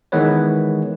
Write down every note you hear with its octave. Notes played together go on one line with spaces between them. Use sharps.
D#3 E3 G#3 B3 B4 C#5